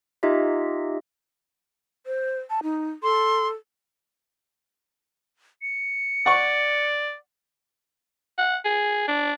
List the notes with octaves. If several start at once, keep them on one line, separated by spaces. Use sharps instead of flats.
D#4 F4 G4 D#5 E5
C5
A5
D#4
A4 C6
C#7
D5 F#5 C#6
F#5
G#4
D4